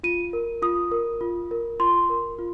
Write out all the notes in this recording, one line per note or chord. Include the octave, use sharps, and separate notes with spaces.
F4 D#7
A#4
F4 D#6
A#4
F4
A#4
F4 C6
A#4
F4